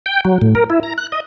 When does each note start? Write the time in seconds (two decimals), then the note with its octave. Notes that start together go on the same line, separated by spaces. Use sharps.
0.06 G5
0.25 F#3
0.41 A2
0.55 A#4
0.70 E4
0.83 A#5
0.98 F#6
1.12 D#5